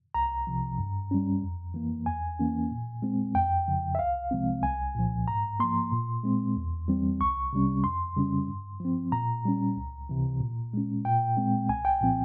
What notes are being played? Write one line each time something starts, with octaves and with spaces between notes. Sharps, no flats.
C2 A#5
C3 F3
G2
G3 C#4
F2
E3 A#3
E2 G#5
E3 A#3 C#4
A#2
G#3 C4
F2 G5
C#3 F3
E5
C2 F5
C3 F3 G#3 C4
C2 G#5
A#2 F3
G#2 A#5
F3 A#3 C6
A#2
G#3 C4
E2
E3 G3 C4
C2 C#6
C3 G3 C#4
F2 C6
C#3 G3 C#4
G2
F3 C4
A#2 A#5
G3 C#4
C#2
C3 E3
A#2
G#3 C#4
A#2 G5
G#3 C4
C2 G#5
G5
A#2 F3 C4